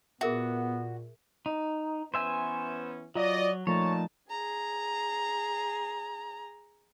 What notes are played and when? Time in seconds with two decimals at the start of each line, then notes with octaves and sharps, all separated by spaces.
0.21 A#2 B3 F#4 G#4 A#4 E5
1.46 D#4
2.14 E3 B3 C#4 C5 E5 G#5
3.16 F#3 F4 D5 D#5
3.67 A#2 F3 A3 D#4 C#5 A5 A#5
4.30 G#4 A#5